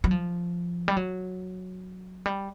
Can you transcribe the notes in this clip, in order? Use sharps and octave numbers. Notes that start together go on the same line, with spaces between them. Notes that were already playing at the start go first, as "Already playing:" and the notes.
F#3
F3
G3
F#3
G3